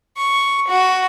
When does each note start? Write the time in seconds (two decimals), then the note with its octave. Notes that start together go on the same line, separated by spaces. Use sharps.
0.17 C#6
0.68 F#4